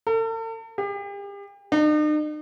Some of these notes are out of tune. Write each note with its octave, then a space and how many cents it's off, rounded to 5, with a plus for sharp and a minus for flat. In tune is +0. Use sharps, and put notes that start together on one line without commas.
A4 +45
G4 +40
D#4 -45